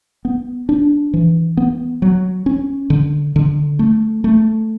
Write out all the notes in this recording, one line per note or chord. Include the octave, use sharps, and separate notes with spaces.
B3
D4
E3
B3
F#3
C#4
D3
D3
A3
A3